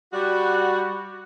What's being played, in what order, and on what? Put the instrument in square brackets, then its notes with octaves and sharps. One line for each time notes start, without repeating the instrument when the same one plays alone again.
[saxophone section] G3 F#4